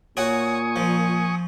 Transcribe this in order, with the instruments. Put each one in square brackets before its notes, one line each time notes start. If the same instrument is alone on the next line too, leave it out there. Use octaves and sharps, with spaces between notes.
[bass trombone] A#2 [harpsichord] F#4 C#5 [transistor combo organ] G#5 C#6 D#6
[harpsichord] F3